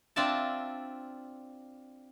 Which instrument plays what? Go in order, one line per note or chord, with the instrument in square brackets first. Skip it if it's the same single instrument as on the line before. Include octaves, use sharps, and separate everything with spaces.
[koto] C4 D4 F4 D5 E5 A5